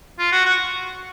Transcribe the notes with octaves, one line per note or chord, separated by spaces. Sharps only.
F4
F#4
F#4